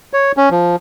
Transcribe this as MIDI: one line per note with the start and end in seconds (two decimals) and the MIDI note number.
0.13 0.32 73
0.37 0.49 61
0.51 0.76 53